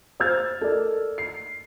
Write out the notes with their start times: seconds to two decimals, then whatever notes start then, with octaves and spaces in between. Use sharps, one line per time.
0.20 C5 F5 E6 F6 G#6 A6
0.61 A4 A#4 D5 D#5
1.18 C7